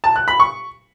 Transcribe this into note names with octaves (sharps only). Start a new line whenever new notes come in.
A5
F#6
B5
C#6